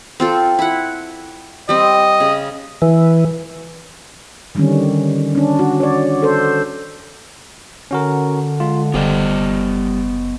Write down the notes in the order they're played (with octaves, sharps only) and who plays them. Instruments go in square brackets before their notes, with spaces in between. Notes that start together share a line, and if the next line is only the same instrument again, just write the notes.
[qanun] C4 F4 A4
E4 F#5
[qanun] G3 C4 [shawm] D#5
[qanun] C#3
[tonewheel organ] E3
[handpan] D3 D#3 G3 C4 C#4
C#4 D4
F#4
C#5 D5
A4 C5
[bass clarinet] D3 [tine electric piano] C#4 F#4 A#4
[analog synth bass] G#3 [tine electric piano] F4
[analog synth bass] F#1 [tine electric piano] G3 G4 [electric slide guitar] B3 C5 D#5